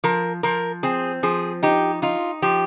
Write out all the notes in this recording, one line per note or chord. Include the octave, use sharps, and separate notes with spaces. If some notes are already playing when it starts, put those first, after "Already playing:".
F3 A#4
F3 A#4
C4 G#4
F3 G#4
D#4 G4
D#4 F4
F3 G4